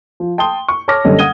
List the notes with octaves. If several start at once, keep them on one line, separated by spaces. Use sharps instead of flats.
F3
G5 A5 C6 D#6 G7
C#6
C#5 A5 C#6 D6 F6 A#6
F#1 D3 G3 C#4 A4 D#5
F#5 D#6 G#6 D#7 G7